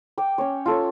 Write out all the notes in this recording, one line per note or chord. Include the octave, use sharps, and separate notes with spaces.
G5 D6
C#4 C#5
F4 A4 C#5